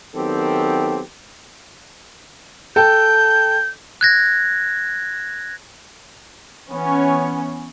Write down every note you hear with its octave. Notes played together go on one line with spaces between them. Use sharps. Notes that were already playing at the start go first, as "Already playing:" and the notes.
D#3 F#3 B3 C4 G4 A4
A4 G5 A5 G6
F#6 G#6 A#6
E3 B3 C#4